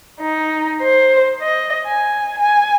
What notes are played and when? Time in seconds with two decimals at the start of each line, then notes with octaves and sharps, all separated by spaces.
0.20 D#4
0.82 C5
1.41 D#5
1.86 G#5
2.39 G#5